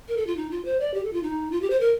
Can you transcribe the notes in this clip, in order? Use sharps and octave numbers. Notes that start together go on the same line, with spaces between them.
A#4
A4
F4
D#4
F4
C5
D5
G4
A4
F4
D#4
F4
G4
C5
A#4